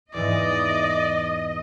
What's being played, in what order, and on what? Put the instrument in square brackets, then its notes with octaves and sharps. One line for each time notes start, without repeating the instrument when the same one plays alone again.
[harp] E2 G#2 E3 [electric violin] D5 [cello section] D#5